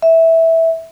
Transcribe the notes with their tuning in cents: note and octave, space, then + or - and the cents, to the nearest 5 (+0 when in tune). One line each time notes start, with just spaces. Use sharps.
E5 -10